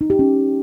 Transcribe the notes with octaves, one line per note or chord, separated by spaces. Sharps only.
D#4
G4
C#4